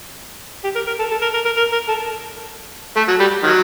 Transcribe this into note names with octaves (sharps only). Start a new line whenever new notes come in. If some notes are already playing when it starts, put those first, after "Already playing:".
G4
A#4
A#4
A4
A4
A#4
A#4
A#4
A#4
A#4
A4
A3
F#3
G3
D#3 F#3